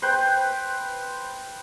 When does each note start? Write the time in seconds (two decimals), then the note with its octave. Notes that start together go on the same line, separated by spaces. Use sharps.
0.02 B4 C5 G5